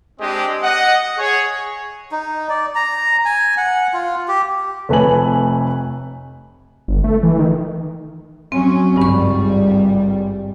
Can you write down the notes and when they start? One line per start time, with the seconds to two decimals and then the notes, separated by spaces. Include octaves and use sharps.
0.20 G#3 C4 D4 G4 G#4 D#5
0.63 D#5 F#5
1.18 G#4 C#5
2.12 D#4
2.49 D5
2.75 A#5
3.25 G#5
3.57 F#5
3.93 F4
4.28 G4
4.89 F1 A3 B4 C#5 G#5 F#7
6.88 G1
7.04 A3
7.23 E3
7.39 D#3
8.52 F#3 C4 C#4
8.97 G#1 C#2 G2 G3 C#6